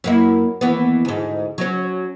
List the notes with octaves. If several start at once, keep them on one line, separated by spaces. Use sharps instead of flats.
F#2 A#3 E4
D#2 E3 B3
D2 G#2
F#3 C#4